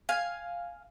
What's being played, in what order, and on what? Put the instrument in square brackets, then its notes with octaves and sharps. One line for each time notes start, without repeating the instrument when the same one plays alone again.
[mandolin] F5 G#5